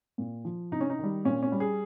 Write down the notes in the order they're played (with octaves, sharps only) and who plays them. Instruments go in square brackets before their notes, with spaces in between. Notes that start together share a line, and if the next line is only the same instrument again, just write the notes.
[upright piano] A#2
F3
C3 D#4
C#4
D#4
D#3 G3
A#2 C#4
C#4
G3
G#4